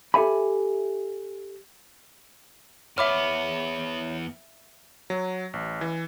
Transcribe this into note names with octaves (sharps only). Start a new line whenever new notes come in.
G4 A4 E5 G#5 B5
E2 B3 C#5 E5 B5 D6 F6
F#3
A1
E3